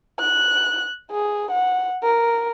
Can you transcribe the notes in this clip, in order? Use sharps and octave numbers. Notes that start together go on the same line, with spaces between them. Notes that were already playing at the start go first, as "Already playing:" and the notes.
F#6
G#4
F#5
A#4